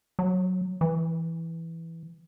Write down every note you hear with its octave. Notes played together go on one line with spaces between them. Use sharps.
F#3
E3